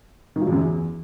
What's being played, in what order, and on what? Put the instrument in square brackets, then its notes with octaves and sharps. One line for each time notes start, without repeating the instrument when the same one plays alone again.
[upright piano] D#3
F3
E2
F#2
E2